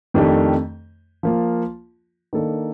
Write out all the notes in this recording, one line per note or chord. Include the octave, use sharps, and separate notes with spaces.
F2 D#3 A3 D4 G4
F3 A#3 F4
D#3 A#3 D4 A4